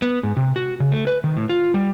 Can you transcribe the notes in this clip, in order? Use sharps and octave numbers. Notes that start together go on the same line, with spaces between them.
B3
G#2
C3
F#4
C#3
A3
B4
D#3
A2
F4
G3